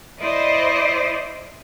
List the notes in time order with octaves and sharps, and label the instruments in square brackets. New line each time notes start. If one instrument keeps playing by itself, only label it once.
[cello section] E4 C5 D5 D#5